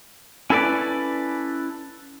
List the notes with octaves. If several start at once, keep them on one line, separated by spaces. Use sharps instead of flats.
C#4 E4 A4 B4 D5